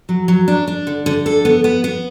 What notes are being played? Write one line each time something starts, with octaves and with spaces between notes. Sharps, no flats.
F#3
F#3
D4
D4
D3
D3
A4
B3
B3
B3